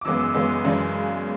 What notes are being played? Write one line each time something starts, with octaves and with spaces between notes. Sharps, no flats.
D6
F#2 C#3 E3 G#3 B3 E6
E6
F#2 C#3 E3 G#3 B3
F#2 C#3 E3 G#3 D4